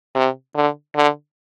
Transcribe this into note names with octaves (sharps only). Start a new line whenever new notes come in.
C3
D3
D3